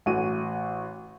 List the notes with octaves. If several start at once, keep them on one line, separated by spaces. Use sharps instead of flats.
A1 F#4 D#7